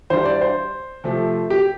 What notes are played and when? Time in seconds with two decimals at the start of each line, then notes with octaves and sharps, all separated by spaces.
0.10 E3 G3 D4 C5
0.26 D5
0.41 C5
1.04 C3 F3 A3 C4
1.50 G4